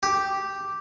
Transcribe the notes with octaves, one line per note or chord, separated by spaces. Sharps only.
G4